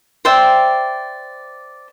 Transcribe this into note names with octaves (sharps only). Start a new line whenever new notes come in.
C5 D5 E5 G5